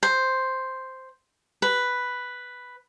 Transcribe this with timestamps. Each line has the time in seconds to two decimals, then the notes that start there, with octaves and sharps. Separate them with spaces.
0.03 C5
1.62 B4